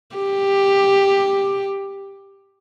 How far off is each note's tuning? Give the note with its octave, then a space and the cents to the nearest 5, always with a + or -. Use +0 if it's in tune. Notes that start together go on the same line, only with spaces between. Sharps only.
G4 +10